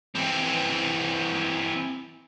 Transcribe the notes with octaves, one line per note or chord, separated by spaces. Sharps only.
E3 C4